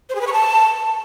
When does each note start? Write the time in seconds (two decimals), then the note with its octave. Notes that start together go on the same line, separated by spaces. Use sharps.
0.09 C5
0.15 G#4
0.21 B4
0.27 C#6
0.33 A5